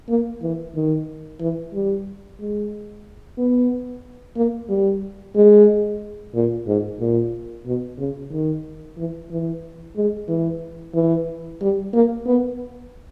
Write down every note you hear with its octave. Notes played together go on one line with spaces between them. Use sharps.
A#3
E3
D#3
E3
G3
G#3
B3
A#3
G3
G#3
A#2
G#2
A#2
B2
C#3
D#3
E3
E3
G#3
E3
E3
G3
A#3
B3